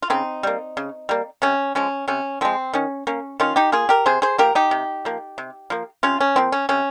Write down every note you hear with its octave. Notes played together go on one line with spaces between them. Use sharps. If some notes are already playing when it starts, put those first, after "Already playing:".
F4
C#3 C4 D#4
G3 A#3
C#3
G3 A#3
C3 C#4
F3 G#3 C#4
C3 C#4
F3 G#3 C4
D#3 C#4
A#3 C#4
D#3 C#4 F4
D#4 G4
A#3 F4 G#4
G4 A#4
C3 G#4 C5
G#4 C5
F3 A#3 G4 A#4
D#4 G4
C3
F3 A#3
C3
F3 A#3
C3 C#4 F4
C#4
F3 A#3 C4
C#4
C3 C#4